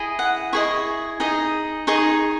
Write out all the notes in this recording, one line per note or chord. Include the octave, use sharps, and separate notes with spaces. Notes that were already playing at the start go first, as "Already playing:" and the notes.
Already playing: E4 G#4 D#5
F#5
E4 G#4 D#5 C#6
D#4 G#4 D#5
D#4 G#4 D#5 C#6